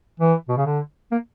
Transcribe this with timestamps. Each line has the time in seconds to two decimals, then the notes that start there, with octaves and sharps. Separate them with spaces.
0.20 E3
0.48 B2
0.57 C#3
0.66 D3
1.11 A#3